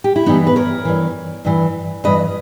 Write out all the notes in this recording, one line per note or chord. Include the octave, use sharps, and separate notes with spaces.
G4
E4
G2 E3 B3 D#4
B4
A#4 C#5
G2 E3
G2 E3
G2 E3 B4 D#5